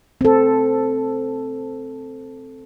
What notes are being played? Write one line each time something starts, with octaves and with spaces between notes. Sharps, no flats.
C4 A4